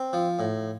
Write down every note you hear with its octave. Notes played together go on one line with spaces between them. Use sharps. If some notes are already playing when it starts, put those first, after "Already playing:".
Already playing: C4
F3
A2